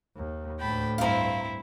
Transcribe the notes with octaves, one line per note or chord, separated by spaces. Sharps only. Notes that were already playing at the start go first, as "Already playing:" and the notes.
D#2
D2 A2 G5 A5 B5
G2 C4 E4 F5 A#5